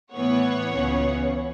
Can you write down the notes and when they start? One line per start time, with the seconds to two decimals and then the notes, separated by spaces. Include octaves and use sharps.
0.13 A2 E3 B3 C#5 F#5
0.70 C#2 C#3 E3 B3